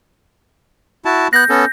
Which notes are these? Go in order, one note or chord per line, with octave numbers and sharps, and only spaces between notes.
E4 F#4 A5
B3 F#6 G6 A#6
B3 C#4 A4